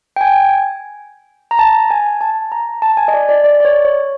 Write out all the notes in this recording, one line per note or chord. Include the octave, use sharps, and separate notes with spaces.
G5
G#5
A#5
A5
G#5
A5
A#5
A5
G#5
D#5
D5
D5
D5
D5
C#5
C#5